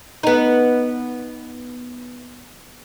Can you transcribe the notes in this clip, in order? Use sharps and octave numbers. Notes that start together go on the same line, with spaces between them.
B3 D#4